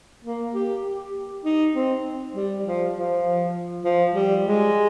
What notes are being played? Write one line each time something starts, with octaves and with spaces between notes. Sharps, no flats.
A#3
G4
G4
D#4
C4
G3
F3
F3
F3
G3
G#3